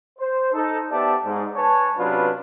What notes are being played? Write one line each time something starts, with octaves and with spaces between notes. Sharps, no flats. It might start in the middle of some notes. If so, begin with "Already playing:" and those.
C5
D#4 A4
B3 G4 D5 E5 A5
G#2
B4 C#5 G#5 A5
C3 F#3 C#4 D4 F4 B4